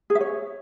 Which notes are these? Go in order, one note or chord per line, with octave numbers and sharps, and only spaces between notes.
G#4
E5
C#5